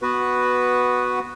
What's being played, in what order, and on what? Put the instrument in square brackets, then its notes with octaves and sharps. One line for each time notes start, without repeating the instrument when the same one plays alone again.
[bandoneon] B3 F#4 B4